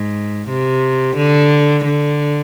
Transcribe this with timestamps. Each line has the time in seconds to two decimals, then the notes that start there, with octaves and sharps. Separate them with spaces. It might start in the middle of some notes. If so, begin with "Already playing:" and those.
Already playing: G#2
0.49 C3
1.16 D3
1.85 D3